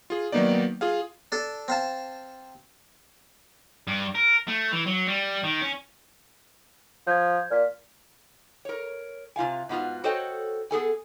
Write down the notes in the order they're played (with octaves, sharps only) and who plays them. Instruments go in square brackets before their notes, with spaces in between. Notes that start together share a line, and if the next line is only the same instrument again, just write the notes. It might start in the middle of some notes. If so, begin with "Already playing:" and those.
[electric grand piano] F4 G#4
D#3 F#3 A#3 B3 D#4 D5
F4 G#4 F5
[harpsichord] D4 A4
C4 F5 A5
[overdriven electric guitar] G2
A#4
A3
E3
F#3
G3
D#3
C#4
[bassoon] F3 [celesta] G6 G#6
[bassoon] A#2 [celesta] F6 B6
[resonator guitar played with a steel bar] A#4 C#5
C3 F4 F5 G#5
G#2 B3 F4 F#4
F#4 A4 C5 C#5 D#5 G5
B3 G#4 A4 G#5